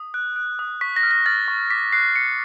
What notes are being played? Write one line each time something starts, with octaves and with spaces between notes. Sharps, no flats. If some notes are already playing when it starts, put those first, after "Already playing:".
Already playing: D#6
F#6
F#6
D#6
C#6 B6
A#6
F6
A#6
F6 A6
C#6
D6 B6
F#6 C7
F#6 C#7